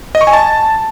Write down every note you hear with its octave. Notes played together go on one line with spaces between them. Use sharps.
D#5
C#6
G#5
A5